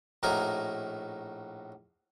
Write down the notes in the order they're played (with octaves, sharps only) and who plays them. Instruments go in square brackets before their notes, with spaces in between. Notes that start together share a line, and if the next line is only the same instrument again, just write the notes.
[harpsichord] A#1 A2 D#4 F#4 A#4 G#5